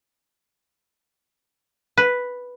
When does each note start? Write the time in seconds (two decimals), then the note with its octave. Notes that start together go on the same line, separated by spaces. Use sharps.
1.97 B4